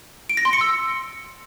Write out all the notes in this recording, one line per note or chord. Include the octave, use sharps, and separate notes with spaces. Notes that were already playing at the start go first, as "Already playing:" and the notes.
D7
A#6
C6
C#7
E6